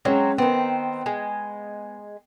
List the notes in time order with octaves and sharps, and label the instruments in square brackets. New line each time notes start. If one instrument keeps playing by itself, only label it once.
[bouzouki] F#3 C4 [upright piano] G#3 C#4
[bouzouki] D#3 C4 [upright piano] B3
[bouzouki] G#3